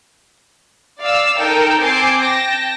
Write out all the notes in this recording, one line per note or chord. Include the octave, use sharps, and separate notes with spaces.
D5 F5 E6
D#4 A4 A#4 G5
C4 G#5 A5 D6 C7
G5 A5 A#6